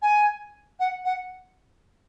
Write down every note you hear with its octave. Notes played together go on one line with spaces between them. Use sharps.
G#5
F#5
F#5